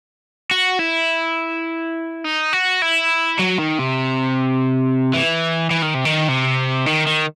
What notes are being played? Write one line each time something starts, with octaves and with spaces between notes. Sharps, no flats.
F#4
E4
D#4
F#4
E4
F#3
D#3
C3
E3
E3
D#3
C3
D#3
C3
D#3
D#3